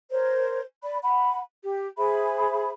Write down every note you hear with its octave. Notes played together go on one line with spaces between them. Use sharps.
A#4 C5 C#5
D5 B5
F#5 B5
G4
G#4 C5 E5 B5